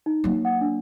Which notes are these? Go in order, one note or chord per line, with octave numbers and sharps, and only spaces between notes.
D#4
F#3 A#3
F#5
D4